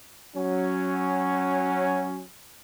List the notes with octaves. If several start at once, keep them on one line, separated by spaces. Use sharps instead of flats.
F#3 C#4